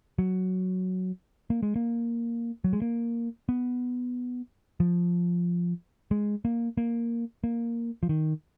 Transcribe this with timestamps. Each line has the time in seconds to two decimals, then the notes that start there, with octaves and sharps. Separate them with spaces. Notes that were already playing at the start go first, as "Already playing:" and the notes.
0.19 F#3
1.50 A#3
1.63 G#3
1.76 A#3
2.64 F#3
2.73 G#3
2.82 A#3
3.49 B3
4.80 F3
6.11 G#3
6.45 A#3
6.77 A#3
7.44 A#3
8.03 F3
8.09 D#3